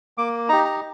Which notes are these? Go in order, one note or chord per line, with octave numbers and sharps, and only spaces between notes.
A#3 D6
D#4 G4 A#5
A#5